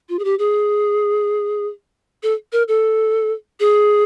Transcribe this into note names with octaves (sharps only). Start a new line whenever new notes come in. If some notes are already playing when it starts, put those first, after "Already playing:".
F4
G#4
G4
G#4
A4
A#4
A4
G#4